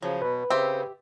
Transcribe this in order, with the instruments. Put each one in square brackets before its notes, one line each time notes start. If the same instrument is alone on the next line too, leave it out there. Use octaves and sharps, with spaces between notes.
[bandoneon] C#3 F3 [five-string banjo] F#3
[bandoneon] B2 [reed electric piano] B4
[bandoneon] C#3 [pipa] C4 [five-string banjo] G4 E5